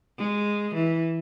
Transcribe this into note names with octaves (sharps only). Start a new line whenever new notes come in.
G#3
E3